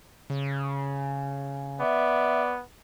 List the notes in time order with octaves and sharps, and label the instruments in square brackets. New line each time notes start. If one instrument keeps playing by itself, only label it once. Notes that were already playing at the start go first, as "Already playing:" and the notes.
[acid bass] C#3
[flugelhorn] B3 [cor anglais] D5 [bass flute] E5